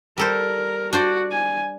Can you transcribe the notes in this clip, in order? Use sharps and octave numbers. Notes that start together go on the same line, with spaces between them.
G3 A4 A#4 C5
D4 F#4 C5 D5
G#5